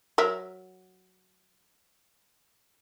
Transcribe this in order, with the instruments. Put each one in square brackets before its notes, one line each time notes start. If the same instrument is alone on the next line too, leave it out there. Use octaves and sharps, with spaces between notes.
[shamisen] F#3 A#4 E5